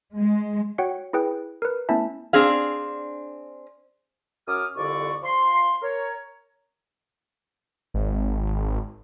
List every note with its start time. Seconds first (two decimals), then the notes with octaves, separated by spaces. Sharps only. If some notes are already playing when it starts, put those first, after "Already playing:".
0.18 G#3
0.78 F#4 C#5 F#5 G5
1.13 E4 G#4 B4 G5
1.62 A#4 B4
1.89 A3 B3 C#4 E4 E5 A5
2.33 C4 D4 G#4 F5
4.48 F#2 D6 D#6 F6
4.76 C2 F2 D3 D5 C#6
5.23 F3 C6
5.82 A#4 C#5
7.94 G#1